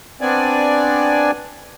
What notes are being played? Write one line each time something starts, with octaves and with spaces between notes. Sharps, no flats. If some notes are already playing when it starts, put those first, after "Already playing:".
B3 C4 D4 D5 G#5